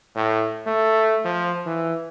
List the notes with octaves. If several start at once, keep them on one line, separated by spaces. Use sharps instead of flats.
A2
A3
F3
E3